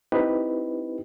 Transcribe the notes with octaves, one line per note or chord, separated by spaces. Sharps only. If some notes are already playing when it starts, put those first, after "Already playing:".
C4 D#4 E4 G4 B4